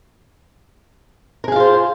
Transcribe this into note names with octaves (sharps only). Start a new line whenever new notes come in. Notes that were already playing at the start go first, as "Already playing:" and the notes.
F4 G#4 A#4 C5 F5